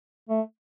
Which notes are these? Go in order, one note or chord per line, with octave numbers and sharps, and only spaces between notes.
A3